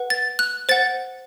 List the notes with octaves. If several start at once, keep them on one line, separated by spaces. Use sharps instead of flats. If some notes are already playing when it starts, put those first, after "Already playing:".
Already playing: B4 F#5
A6
F#6
C5 F#5 A6